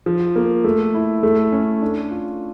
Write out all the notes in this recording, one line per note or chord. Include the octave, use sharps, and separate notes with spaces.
F3
A#3
A3
E4
A3
C#4
D4
F4